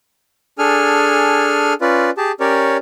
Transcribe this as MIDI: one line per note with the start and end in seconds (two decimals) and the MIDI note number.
0.59 1.74 62
0.59 1.74 68
0.59 1.74 69
0.59 1.74 80
0.59 1.74 89
1.81 2.10 61
1.81 2.10 65
1.81 2.10 71
1.81 2.10 74
2.18 2.32 67
2.18 2.32 68
2.18 2.32 81
2.40 2.77 61
2.40 2.77 67
2.40 2.77 70
2.40 2.77 73
2.40 2.77 74